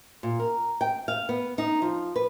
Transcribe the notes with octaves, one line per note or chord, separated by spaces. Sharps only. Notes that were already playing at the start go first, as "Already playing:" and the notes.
A#2
A#4
G5
F5
B3
D#4
F3
B4